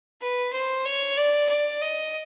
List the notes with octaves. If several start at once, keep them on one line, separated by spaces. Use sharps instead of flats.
B4
C5
C#5
D5
D5
D#5